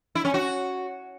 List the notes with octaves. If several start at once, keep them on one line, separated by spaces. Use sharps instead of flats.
E4
C#4
F#4